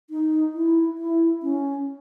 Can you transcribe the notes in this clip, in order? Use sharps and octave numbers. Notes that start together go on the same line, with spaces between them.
D#4
E4
E4
C#4